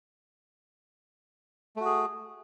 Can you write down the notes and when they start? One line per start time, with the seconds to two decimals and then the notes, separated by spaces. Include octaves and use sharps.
1.76 A3
1.81 F#4
1.85 G#4